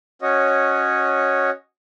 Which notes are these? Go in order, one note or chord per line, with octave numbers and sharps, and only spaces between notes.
C#4 F#4 C#5 D#5